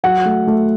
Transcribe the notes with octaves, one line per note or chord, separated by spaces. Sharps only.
F#3 F#5
A3
A3